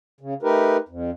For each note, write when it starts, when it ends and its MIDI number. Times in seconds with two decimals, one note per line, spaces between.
0.21 0.34 49
0.43 0.77 57
0.43 0.77 63
0.43 0.77 67
0.43 0.77 70
0.43 0.77 71
0.89 1.11 41